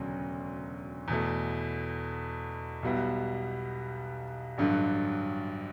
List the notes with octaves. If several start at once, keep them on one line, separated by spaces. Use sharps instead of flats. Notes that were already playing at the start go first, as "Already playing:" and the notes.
Already playing: E1 D2 C#3 F#3
E2 B2 A3
B1 B2 G3 B3 E4
A1 G2 D3 F#3